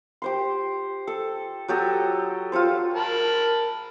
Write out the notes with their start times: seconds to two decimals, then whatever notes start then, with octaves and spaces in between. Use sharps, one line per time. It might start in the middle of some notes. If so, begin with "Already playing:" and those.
0.22 G4 C5 C6
1.07 A4
1.68 F#3 G4 A4 D#5
2.52 F4 G4 A4 C5
2.94 A#4 A5 B5